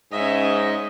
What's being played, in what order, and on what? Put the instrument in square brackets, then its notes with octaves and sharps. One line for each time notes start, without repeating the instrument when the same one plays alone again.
[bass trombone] G#2 [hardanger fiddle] C#4 E5 [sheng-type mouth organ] D#5